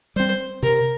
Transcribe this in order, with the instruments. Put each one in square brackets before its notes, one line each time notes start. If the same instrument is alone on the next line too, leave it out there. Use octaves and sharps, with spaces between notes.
[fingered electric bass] G3 C4 [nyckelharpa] C5
[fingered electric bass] C3 [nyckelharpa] A#4